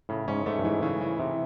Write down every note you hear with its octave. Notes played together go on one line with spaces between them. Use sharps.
A2 C#3
G#2 C#4
G#2 A3
G2
G#2 E3
C#3 E3
E3
C3 E3